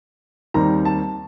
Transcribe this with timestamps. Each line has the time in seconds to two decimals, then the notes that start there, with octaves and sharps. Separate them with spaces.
0.54 D#2 D#3 G3 C4 A#5
0.85 A5